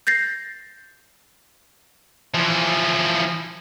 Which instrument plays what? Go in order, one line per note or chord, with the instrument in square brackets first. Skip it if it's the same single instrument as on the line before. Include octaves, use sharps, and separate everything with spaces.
[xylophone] G6 A6 A#6 C7
[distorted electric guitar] E3 F3